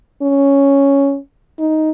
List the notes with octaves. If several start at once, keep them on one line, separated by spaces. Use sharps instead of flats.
C#4
D#4